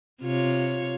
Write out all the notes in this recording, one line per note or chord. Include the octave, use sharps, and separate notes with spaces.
C3 F4 C#5